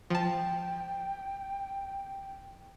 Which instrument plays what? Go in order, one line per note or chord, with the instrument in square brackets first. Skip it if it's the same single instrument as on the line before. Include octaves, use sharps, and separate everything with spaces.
[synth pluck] F3 A5 [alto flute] G5